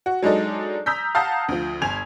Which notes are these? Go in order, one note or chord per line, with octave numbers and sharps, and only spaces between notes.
F#4
F#3 G#3 D4 D#4 A4
A#5 D#6 E6 G6 B6
F5 F#5 A5 A#5 D#6 G6
D2 F3
G1 G#5 G#6 F7